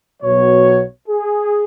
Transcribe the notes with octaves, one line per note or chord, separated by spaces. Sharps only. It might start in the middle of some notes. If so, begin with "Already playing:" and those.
B1 B2 F#3 C#5
G#4